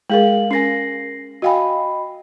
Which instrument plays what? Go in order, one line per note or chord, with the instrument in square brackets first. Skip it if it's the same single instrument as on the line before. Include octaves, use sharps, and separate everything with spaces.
[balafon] G#3 G#4 A#4 [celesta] F5 F#7
[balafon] C#4 A#4 G#5 [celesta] A#6 C7
[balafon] F#4 F5 G#5 [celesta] D#5 G5 B5